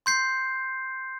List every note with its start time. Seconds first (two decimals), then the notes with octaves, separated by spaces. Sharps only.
0.06 C6 G6 C7